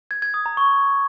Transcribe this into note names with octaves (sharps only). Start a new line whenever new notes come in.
G#6
G#6
D#6
A#5
C#6